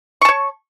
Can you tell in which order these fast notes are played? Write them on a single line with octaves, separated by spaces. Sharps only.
C#6 A5 C#5